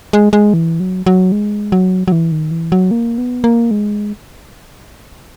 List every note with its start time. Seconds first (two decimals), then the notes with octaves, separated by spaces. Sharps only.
0.13 G#3
0.33 G#3
0.54 E3
0.80 F#3
1.06 F#3
1.32 G#3
1.72 F#3
2.08 F#3
2.12 E3
2.32 D#3
2.51 E3
2.72 F#3
2.91 A#3
3.18 B3
3.44 A#3
3.71 G#3